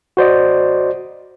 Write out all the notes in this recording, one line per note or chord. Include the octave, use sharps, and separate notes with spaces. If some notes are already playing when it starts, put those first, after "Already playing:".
F#4 C5 D5 D#5